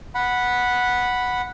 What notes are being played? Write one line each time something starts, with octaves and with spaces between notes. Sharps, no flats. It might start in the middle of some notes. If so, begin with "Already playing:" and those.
F#5 B5